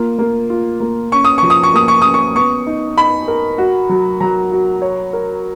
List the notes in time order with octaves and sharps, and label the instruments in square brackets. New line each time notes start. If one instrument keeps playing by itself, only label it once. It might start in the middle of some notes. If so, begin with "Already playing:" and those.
Already playing: [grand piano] A#3 F4
A#3
F4
A#3
[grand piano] C#4 [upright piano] C#6
[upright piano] D#6
[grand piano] F3 [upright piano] C#6
[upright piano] D#6
C#6
[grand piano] A#3 [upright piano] D#6
[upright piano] C#6
[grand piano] C#4 [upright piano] D#6
[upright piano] C#6
[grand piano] B3 [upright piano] C#6
[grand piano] D#4
[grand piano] D#4 [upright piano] B5
[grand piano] A#4
F#4
F#3
[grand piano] F#3 [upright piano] A#5
[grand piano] F#4
C#5
A#4